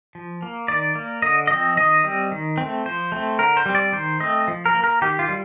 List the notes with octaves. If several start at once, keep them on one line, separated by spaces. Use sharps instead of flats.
F3
A#3
D#3 D5
A#3
D3 D#5
F3 C4 D#5
D#3 D#5
G3 C4
D#3
C4
A3
F3 C5
A3 C4
D3 A#4
C5
G3 C4
D5
D#3 C5
A3 C4 D#5
F3
A#4
A#3
A#4
D#3 G4
F4
G3